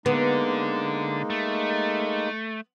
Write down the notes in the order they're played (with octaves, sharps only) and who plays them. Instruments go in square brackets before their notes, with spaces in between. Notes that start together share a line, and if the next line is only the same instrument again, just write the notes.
[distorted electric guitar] D3 [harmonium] G#3 A#3 D#4 [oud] B3
[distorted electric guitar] A3